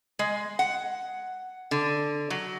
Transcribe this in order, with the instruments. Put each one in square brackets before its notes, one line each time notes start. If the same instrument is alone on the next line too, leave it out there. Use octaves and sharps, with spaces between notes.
[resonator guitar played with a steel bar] G#3
F#5
D3
F#3